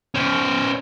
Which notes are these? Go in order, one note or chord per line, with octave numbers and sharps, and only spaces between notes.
C#4 C5